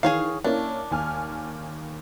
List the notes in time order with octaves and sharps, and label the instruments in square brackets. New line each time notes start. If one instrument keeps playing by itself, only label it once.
[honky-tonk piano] D#3 E3 [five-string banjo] G#4 C#5 F5
[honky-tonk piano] A#3 C#4 E4 [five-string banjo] D4
[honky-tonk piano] D#2 G#5 F6